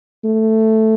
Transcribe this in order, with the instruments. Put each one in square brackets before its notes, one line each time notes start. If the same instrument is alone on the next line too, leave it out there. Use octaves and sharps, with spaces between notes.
[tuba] A3